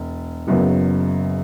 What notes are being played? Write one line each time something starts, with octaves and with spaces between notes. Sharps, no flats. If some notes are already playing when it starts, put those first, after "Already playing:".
Already playing: E1
F#1 F#2 C#3 F#3 B3